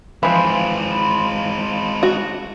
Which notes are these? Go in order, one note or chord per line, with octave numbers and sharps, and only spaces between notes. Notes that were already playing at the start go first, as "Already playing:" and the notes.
E3 F3 G#3 C4 F5 B5 C6
F#4